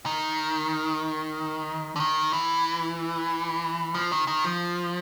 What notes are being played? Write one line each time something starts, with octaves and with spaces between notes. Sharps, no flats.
D#3
D3
D#3
E3
F3
D#3
D#3
F3